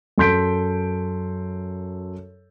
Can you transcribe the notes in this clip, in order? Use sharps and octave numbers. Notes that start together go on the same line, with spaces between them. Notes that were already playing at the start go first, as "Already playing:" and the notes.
F#2 A4 C6 G6 B6 D7